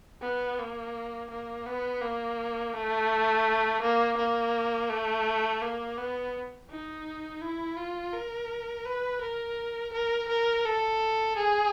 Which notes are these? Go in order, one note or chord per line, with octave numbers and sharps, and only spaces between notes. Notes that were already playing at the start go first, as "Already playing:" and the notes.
B3
A#3
A#3
B3
A#3
A3
A#3
A#3
A3
A#3
B3
D#4
E4
F4
A#4
B4
A#4
A#4
A#4
A4
G#4